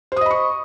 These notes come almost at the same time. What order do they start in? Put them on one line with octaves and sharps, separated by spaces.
C5 D#6 D#5 B5 C#6